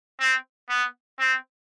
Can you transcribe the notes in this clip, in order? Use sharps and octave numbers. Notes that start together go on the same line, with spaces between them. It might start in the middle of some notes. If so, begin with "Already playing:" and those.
C4
B3
C4